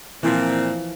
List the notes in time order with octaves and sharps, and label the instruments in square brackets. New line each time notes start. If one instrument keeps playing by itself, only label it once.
[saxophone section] A#2 C4 [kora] E3 F3